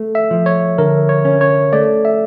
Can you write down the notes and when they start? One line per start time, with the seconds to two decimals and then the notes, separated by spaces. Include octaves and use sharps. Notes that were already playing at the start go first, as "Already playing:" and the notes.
Already playing: A3
0.15 E5
0.31 F3
0.46 C#5
0.78 D3 A#4
1.09 C#5
1.25 C#4
1.41 C#5
1.73 A3 D5
2.05 E5